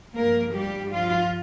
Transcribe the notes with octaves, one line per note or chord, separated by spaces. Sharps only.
G2 F3 A#3 A#4
G3 G4
F3 F4